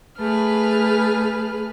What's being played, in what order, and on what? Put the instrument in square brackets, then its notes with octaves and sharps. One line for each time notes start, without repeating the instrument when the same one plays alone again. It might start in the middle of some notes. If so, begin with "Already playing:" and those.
[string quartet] A3 G#4 B4 F6